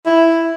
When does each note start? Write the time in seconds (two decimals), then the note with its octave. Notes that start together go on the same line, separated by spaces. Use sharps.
0.06 E4